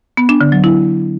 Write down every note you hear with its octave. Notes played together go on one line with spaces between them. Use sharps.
B3
D4
D3
F#3
E4